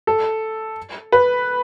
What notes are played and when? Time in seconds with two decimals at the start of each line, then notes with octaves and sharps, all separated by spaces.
0.07 A4
1.12 B4